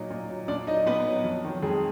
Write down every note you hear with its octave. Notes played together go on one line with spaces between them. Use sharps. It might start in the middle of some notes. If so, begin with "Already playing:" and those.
Already playing: A#2 F#3 D#4 D#5
A#2
F#3
A#2 D4 D5
F#3 D#4 D#5
A#2 B3 B4
F#3
F2
D#3 F#3
F2 G#3 G#4